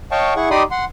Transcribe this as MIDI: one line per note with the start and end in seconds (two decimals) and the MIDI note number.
0.11 0.34 73
0.11 0.34 75
0.11 0.34 77
0.11 0.34 79
0.11 0.34 81
0.11 0.34 85
0.36 0.49 64
0.36 0.49 68
0.36 0.49 78
0.36 0.49 85
0.51 0.63 63
0.51 0.63 67
0.51 0.63 74
0.51 0.63 83
0.51 0.63 84
0.51 0.63 87
0.71 0.85 78
0.71 0.85 84